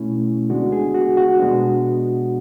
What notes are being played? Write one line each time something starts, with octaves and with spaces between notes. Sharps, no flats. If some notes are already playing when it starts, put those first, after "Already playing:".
Already playing: B2 A3 C#4 E4
D2 D3 G#3 B3 D4 F#4
G#4
F#4
F#4
B2 G#3 B3 D4